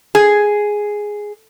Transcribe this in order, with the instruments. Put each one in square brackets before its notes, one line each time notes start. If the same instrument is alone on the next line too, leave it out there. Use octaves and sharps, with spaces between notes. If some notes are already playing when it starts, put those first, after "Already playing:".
[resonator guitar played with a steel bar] G#4